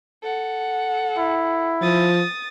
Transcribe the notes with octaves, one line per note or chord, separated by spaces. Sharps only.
A4 F#5
E4
F3 D#6 A6